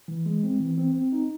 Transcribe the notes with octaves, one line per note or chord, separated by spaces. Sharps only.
E3
G#3
C4
E3
C4
C4
D#4